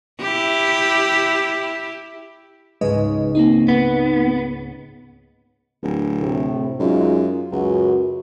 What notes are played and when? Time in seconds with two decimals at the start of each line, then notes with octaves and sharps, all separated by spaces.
0.20 E4 G4
2.81 C#2 G#2 G#3 B4 D#5
3.35 A#3 C4 D#4
3.68 B3
5.83 D1
6.19 A2 C3
6.79 F#2 G#3 D#4 F4
7.52 C#2 F#2 F#4